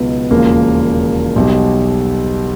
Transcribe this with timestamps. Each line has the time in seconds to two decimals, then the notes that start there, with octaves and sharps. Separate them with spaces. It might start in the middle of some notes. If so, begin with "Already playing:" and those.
Already playing: C#2 B2 F#3 B3 D#4
0.30 E1 D#2 C#3 F3 A#3
1.36 B1 B2 G3